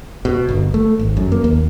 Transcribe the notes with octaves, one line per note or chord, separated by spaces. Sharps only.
B2
G1
A3
G#1
F#2
A#3
D#2